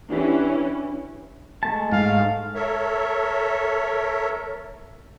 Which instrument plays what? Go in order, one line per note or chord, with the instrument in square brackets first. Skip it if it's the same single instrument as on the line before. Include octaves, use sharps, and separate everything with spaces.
[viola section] E3 C#4 [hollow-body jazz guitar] D4 F#4 G4
[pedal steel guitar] G#3 A3 A5
[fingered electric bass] G#2 [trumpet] F5
[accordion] A4 A#4 C#5 E5